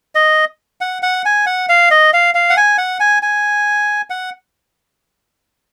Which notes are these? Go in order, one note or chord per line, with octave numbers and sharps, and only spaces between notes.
D#5
F#5
F#5
G#5
F#5
F5
D#5
F5
F5
F#5
G#5
F#5
G#5
G#5
F#5